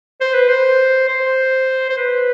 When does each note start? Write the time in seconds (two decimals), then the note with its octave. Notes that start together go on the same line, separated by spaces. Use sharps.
0.21 C5
0.34 B4
0.48 C5
1.09 C5
1.90 C5
1.97 B4